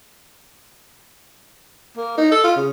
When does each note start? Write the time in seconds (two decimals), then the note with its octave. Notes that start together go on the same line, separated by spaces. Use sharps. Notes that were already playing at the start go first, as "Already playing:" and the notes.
1.97 A#3
2.18 D#4
2.32 A4
2.44 F4
2.57 C#3